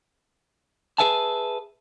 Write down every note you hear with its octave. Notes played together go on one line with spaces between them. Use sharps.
G#4 A#4 B4 E5 G#5 A5